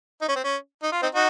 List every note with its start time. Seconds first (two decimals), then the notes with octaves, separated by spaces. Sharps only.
0.21 D#4
0.28 C#4
0.35 C4
0.44 C#4
0.83 D#4
0.92 F4
1.02 C4 D#4
1.15 D#4 F#4